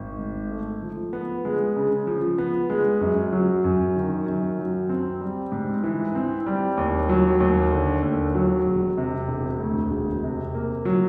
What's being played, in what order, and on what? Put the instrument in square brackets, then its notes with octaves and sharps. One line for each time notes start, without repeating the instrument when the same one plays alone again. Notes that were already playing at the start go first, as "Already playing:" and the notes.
Already playing: [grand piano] G#1
G#2
A3
F3
B3
G#3
C#3
F3
B3
G#3
F#2
F#3
F#2
D#3
F#2
F#3
C4
G3
G#2
E3
C4
G3
D#2
F#3
D#2
D3
D#2
F#3
E1
C3
E1
D2
E1
C3
A#3
F#3